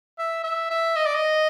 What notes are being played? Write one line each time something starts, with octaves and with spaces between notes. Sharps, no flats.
E5
E5
E5
D#5
D5
D#5